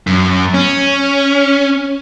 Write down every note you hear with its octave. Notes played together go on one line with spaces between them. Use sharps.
F#2
C#4